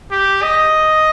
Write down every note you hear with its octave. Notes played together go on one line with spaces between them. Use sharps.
G4
D#5